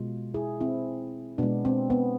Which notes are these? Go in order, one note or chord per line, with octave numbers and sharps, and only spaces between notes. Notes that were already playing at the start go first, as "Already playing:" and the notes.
Already playing: B2 G#3 F4
E4 G#4
C4 E4
B2 G#3 B3 D4
C4
B3